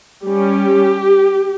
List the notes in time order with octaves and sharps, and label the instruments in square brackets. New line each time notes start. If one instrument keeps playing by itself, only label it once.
[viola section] G3 C#4 G4